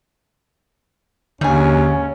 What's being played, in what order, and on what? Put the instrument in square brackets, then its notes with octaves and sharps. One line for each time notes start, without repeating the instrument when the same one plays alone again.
[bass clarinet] D#2 [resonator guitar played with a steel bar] G#2 G#5 [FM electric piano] D3 [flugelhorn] C#4